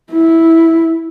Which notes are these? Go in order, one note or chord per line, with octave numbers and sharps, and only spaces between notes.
E4